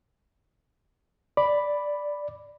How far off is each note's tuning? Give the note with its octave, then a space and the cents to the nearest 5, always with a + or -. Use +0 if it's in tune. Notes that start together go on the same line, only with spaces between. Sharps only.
D5 +0 B5 +0